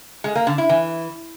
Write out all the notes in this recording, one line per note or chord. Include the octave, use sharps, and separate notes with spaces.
G#3
A#3
D3
E4
E3